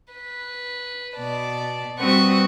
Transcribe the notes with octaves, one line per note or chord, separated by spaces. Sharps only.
B4
B2 D5 A5
G3 C4 F#4 B4 C#6 D#6